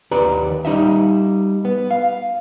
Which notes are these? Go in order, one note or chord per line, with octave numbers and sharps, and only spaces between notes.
D#2 G4 B4 D5 A#5
G3 D#4 D#5 E5
B3
F5